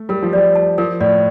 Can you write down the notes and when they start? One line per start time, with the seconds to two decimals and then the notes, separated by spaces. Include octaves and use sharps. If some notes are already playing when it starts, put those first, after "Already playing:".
Already playing: A3
0.09 G3 A#4
0.23 F3
0.33 G3 D5
0.55 A5
0.78 F3 A#4
1.01 A2 D5